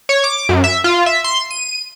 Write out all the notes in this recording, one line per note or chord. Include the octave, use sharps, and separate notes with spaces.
C#5
D6
F#2
E5
F4
E5
C6
D#7